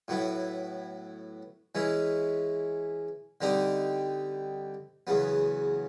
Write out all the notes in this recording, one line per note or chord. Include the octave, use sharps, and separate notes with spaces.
A2 F#3 B3 E4
E3 G#3 C#4 E4
D3 G3 C4 D#4 G4
E2 C#3 F#3 B3